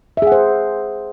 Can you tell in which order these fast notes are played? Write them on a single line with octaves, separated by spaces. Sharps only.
E5 G#4 F#5 C5